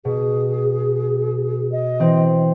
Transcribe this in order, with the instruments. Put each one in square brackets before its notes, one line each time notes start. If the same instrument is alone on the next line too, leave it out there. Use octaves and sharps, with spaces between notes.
[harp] B2 [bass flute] G#4
[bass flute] D#5
[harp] E3 C4